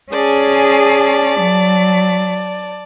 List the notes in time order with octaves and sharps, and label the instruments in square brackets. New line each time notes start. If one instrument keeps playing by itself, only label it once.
[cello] C#4 G#4 [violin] D5 A5
[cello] F#3